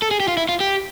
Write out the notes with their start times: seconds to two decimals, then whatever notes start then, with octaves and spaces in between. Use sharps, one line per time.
0.02 A4
0.11 G#4
0.20 G4
0.28 F4
0.37 E4
0.49 F4
0.60 G4